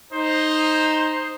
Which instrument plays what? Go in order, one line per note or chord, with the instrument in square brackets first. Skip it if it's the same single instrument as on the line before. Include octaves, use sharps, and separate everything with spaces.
[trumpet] D#4 [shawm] C5